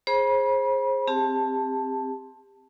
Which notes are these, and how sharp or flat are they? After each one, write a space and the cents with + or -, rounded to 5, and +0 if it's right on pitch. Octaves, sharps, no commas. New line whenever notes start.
G#4 +0 C5 +25 B5 -35
C4 +5 G4 +30 A5 +0